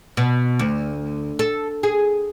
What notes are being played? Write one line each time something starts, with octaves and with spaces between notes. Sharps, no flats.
B2
D2
A4
G#4